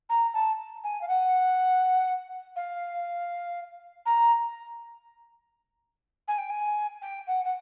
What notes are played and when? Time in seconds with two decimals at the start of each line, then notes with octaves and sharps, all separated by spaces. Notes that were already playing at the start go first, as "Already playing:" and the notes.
0.09 A#5
0.33 A5
0.83 G#5
1.01 F5
1.08 F#5
2.55 F5
4.05 A#5
6.27 G#5
6.38 G5
6.49 G#5
7.01 G5
7.27 F#5
7.44 F#5